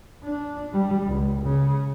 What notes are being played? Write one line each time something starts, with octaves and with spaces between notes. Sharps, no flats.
D4
G3
C#2
C#3